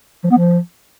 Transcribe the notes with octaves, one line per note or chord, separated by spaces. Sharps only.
F3
B3
F3